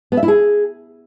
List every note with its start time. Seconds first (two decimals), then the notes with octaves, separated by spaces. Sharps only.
0.12 B3
0.17 E5
0.23 E4
0.28 G#4